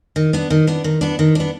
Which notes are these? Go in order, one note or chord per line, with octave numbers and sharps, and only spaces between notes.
D#3
B3 D4
D#3
B3 D4
D#3
B3 D4
D#3
B3 D4